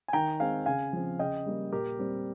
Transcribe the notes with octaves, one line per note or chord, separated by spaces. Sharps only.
G#5
D#3 G5 A#5
G#3 C4 F5 G#5
C#3 F5 G#5
F3 C4
C#3 D#5 G5
G3 A#3
A#2 G4 A#4
G3 C4